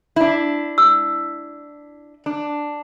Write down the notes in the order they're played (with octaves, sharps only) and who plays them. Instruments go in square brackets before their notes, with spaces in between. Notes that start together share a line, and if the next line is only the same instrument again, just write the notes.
[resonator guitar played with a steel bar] D4 E4
[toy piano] E6
[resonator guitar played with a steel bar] D4